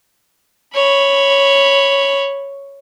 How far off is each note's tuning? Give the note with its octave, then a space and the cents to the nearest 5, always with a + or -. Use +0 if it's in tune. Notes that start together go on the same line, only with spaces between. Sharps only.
C#5 +0 B5 +0